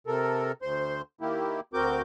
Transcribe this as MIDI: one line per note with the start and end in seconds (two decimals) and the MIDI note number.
0.07 0.52 48
0.07 0.52 69
0.07 0.52 70
0.62 1.02 38
0.62 1.02 72
0.62 1.02 84
1.21 1.60 51
1.21 1.60 58
1.21 1.60 64
1.21 1.60 67
1.74 2.02 38
1.74 2.02 60
1.74 2.02 66
1.74 2.02 70
1.74 2.02 86
1.74 2.02 91